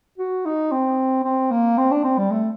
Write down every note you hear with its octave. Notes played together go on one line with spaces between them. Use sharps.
F#4
D#4
C4
C4
A#3
C4
D4
C4
G3
A3